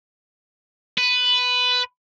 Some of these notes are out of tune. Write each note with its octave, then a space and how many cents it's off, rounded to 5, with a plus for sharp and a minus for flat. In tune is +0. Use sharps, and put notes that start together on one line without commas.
B4 +10